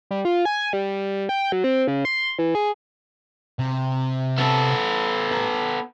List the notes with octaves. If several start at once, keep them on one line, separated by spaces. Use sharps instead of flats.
G3
F4
G#5
G3
G5
F#3
C4
C#3
C6
E3
G#4
C3
B3 A4
B4 A#5